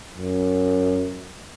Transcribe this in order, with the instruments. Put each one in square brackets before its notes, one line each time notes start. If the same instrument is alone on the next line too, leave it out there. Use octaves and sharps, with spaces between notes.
[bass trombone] F#2